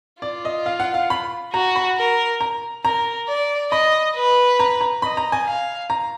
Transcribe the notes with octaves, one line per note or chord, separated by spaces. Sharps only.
F4 D5
D#5
F5
F#5
F5
B5
F#4 A#5
B5
A#4
A#5
A#4 A#5
D5
D#5 B5
B4
A#5
A#5
D#5 B5
A#5
G#5
F5
A#5